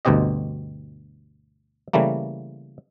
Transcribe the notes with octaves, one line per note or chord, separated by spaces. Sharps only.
G1 D2 B2 C4 G4 D#5
C#3 E3 G3 A3 A#3